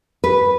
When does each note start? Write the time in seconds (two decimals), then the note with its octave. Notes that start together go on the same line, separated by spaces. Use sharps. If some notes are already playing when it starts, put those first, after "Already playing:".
0.24 B4